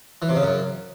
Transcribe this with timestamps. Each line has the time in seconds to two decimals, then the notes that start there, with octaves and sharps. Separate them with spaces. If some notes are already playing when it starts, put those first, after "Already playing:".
0.22 E3
0.29 C3
0.36 C#3
0.43 F#2